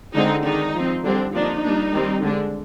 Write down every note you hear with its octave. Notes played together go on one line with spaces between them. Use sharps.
D3 G#3 C4 D#4
D#3 G#3 D4 D#4
F3 C4
D3 G3 C4 D4
F3 A#3 D4 D#4
G3 A#3 D4
D#3 G3 C4
D3 G#3 D4